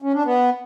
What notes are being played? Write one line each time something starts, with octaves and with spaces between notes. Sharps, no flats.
C#4
D4
B3